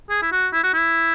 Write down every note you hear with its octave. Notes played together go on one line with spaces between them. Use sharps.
G#4
E4
F#4
E4
F#4
E4